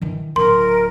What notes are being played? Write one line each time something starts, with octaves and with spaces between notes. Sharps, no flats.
D#3 E3
D1 A#4 C6